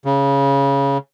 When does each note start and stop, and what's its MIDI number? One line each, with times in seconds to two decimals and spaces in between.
0.05 0.98 49